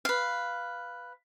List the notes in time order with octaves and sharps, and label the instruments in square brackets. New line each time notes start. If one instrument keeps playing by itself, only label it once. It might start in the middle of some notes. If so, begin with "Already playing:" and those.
[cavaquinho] B4 F5